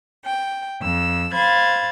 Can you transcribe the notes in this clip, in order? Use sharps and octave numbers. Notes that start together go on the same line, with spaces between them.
G5
F2 E6
C5 F5 B5 G#6 A6